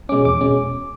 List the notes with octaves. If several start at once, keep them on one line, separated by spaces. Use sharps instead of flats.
B2 G#3 C#4 D6
E2 D6
B2 G#3 C#4